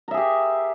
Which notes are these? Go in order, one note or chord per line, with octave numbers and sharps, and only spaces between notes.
G4 G#4 A#4 E5